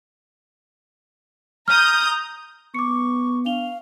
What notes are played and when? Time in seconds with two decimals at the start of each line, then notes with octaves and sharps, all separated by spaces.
1.68 A#5 D#6 F6 G6
2.74 B3 C#6 D6 C#7
3.46 D4 F5 F7 G7